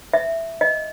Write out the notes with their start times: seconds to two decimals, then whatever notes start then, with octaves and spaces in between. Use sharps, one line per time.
0.14 E5
0.61 D#5